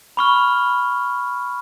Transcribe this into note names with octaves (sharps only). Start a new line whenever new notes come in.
B5 C#6 F6